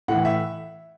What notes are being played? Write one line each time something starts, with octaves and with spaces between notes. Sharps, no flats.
A2 E3 F#5
E5